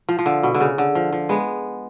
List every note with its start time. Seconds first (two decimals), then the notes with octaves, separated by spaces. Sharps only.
0.09 F3
0.19 F3
0.26 D3
0.43 B2
0.55 D3
0.60 C#3
0.78 D3
0.95 F3
1.13 F3
1.29 G#3 B3